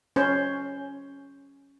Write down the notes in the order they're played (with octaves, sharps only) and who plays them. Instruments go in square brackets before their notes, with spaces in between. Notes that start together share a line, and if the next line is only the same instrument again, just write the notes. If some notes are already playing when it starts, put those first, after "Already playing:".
[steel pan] C#4 C5